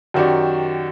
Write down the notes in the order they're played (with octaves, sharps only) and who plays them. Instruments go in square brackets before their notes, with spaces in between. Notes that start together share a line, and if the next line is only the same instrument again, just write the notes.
[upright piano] F#2 D#3 F#4 G4 D5